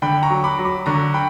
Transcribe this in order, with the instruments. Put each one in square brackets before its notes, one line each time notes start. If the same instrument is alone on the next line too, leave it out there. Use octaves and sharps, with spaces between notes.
[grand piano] D3 G5 B5
A#5 C#6
F#3
B5 D6
F#3
B5 D6
D3 A#5 C#6
G5 B5